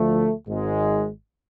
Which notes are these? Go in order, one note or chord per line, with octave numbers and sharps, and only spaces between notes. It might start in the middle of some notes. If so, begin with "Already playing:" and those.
Already playing: D2 D3 F3 A3
G#1 G#2 G#3